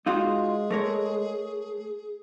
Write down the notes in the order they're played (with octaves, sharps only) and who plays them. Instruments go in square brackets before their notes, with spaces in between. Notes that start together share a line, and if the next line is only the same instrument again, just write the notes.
[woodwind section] G#3 [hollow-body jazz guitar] D#4 F4 F#4 [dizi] G#4
[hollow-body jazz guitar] A3 A#4 C#5